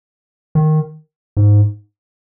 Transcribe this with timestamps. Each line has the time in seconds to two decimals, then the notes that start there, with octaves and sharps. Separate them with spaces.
0.55 D#3
1.37 G#2